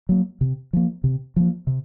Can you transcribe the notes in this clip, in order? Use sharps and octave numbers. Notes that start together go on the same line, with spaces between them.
F#3 A#3
C3
F3 A#3
C3
F3 A#3
C3